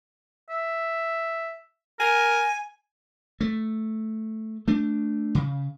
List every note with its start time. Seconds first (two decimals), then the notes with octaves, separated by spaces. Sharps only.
0.50 E5
2.00 A#4 G#5
3.41 A3
4.68 A3 D4
5.35 C#3